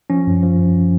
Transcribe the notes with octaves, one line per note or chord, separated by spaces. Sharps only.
F3 C#4
F#2
F3
F#2